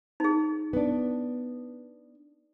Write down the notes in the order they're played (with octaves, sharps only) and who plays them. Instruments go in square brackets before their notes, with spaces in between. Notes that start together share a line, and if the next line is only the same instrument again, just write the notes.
[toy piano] D#4 G#4
[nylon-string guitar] B3 D4